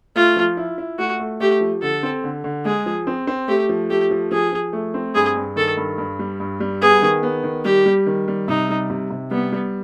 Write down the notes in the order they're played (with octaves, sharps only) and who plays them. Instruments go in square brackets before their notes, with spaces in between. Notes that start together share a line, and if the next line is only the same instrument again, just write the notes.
[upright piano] A3 [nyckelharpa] F4
[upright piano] F3
E4
E4
[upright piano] A3 [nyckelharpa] F#4
[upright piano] A3
[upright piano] A3 [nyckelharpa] G4
[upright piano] F3
[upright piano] D3 [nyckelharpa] A4
[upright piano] C4
D3
D3
[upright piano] G#3 [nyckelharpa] G#4
[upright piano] F3
C4
C4
[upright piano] A3 [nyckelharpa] G4
[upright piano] F3
[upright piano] A3 [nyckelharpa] G4
[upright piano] F3
[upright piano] F3 [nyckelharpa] G#4
[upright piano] F3
A3
C4
[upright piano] G2 [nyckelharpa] G#4
[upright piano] G2
[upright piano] D#3 [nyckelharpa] A4
[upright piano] G2
G2
G3
G2
G3
[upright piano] B3 [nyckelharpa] G#4
[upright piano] D#3
B3
D#3
[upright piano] G3 [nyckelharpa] G4
[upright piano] G3
D#3
G3
[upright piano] C3 [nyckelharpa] D#4
[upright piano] G3
C3
C3
[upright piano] G3 [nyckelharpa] B3
[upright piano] G3